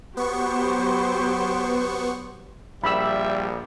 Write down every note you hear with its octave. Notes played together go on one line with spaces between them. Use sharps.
F#3 B3 G4 C5 C#6
A#1 G3 E5 B5 E6